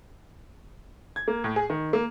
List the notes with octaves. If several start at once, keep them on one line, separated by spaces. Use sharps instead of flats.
G#6
A#3
A2
G#4
D#3
A#3